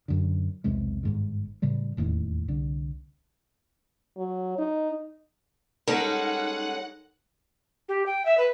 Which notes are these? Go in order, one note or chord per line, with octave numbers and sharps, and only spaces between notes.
F#2 D3
B1 E2 C3 G#3
G1 G#2 D#3
A2 C#3 E3 G3
D#1 E2 A2 D#3
C2 D3
F#3
D#4
G3 G#3 C#4 D#4 A4 A#4 F#5
G4
G5
E5
B4